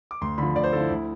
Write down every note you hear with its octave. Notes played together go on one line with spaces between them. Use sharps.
D6
D2 C6
D3 F3 B5
D2 D5
C5
D3 F3 E4 A4
D2